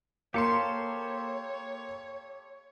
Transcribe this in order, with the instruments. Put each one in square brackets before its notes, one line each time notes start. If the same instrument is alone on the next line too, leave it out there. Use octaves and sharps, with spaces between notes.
[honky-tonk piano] A#3 C#7 [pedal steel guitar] G4 A4 C5 [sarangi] C#5 [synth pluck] F5 C6